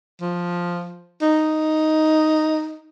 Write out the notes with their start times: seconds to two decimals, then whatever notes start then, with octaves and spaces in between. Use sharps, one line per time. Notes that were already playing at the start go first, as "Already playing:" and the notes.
0.21 F3
1.22 D#4